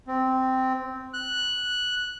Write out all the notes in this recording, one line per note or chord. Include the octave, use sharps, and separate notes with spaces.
C4
F#6